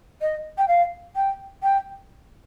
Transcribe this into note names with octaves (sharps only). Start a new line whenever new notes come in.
D#5
G5
F5
G5
G5